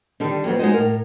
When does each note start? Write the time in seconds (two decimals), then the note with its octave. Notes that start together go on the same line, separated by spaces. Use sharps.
0.20 D3 D#3 G3 A4
0.45 F2 F#3 B3 C4
0.59 G#3 D#4 F#4 C5 D#5
0.74 A2 A#4